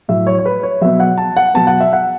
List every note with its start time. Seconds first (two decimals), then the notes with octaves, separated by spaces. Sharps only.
0.08 A2 F#3 E5
0.27 C#5
0.39 C#5
0.46 B4
0.63 C#5
0.81 B2 F#3 E5
1.00 F#5
1.18 A5
1.37 F#5
1.54 B2 F#3 A5
1.67 F#5
1.80 E5
1.93 F#5